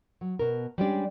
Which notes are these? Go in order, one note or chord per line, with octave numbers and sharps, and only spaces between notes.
F#3
B2 A#4
G3 G#3 C#4 D4 G4 D5